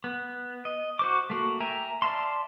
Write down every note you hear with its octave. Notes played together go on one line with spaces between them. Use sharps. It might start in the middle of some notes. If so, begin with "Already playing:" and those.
B3
D#5
F#4 C5 D6
A3 A#3 F#4
A#4 E5 G5 G#5 A#5
D5 E5 F5 A5 C6